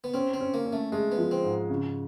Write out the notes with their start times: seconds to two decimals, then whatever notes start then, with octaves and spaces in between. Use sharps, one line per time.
0.04 B3
0.14 C4 C#4
0.34 C4
0.41 C#4
0.54 A#3
0.66 C#4
0.73 A3
0.92 G#3 A3
1.12 B3
1.18 F3
1.31 C4
1.44 G#2
1.70 C#3